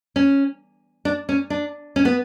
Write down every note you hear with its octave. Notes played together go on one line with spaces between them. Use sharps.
C#4
D4
C#4
D4
C#4
B3